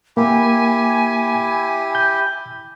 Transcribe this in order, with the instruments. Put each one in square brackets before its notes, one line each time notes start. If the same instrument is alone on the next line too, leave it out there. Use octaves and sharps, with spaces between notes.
[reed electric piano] A#3 [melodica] E4 G4 [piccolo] G#5
[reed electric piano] G6